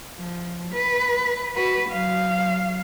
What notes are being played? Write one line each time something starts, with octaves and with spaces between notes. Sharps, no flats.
F3
B4
F#4 B4
F#3 F5